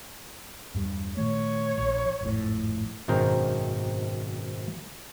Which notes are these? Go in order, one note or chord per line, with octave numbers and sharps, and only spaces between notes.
E2 G2 G3
A#2 D#3 A3 C#5
A#1
G#1 F2 A2
G#1 F#2 B2 D#3 C4 A#4